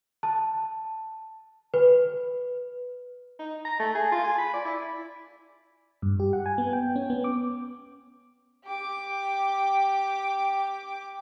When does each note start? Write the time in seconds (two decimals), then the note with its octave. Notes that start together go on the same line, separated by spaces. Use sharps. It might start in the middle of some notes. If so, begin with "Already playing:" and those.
0.23 A5
1.74 B4
3.39 D#4
3.65 A#5
3.79 A3
3.95 G#4
4.12 F4
4.24 G#5
4.38 B5
4.54 D5
4.65 E4
6.02 G2
6.20 G4
6.33 F#5
6.46 G#5
6.58 B3
6.73 G5
6.96 C#4
7.10 B3
7.24 D6
8.64 G4 D6